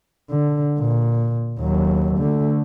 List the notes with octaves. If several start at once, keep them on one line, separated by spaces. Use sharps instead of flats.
D3
A#2
D#2 F#3
D3 A3